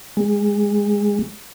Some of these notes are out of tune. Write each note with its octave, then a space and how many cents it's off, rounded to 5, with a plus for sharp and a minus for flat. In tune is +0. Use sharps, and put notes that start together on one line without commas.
G#3 -15